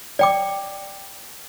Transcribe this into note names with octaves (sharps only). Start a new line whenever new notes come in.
D5 G5 D6